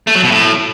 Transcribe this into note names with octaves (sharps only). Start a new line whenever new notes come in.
A3
F#3
B2
A2